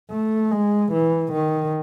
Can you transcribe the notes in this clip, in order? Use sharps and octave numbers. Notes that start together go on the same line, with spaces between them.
A3
G#3
E3
D#3